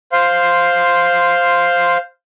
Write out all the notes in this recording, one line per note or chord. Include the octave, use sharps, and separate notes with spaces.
C5 F5 C6